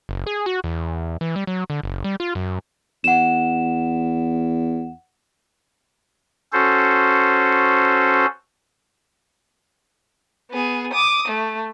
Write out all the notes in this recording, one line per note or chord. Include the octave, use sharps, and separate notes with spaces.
F#1
G#4
F#4
E2
E3
G3
F#3
D3
F#1
G3
F4
F#2
E2 F#5 E7
C#4 F#4 A4 C5
B3 G#4
D6 D#6
A3